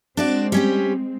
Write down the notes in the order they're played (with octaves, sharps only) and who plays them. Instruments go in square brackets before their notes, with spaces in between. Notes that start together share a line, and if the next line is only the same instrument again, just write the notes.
[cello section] G#3 C4 [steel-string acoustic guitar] D4 F#4 D5
[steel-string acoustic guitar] G3 C#4 G4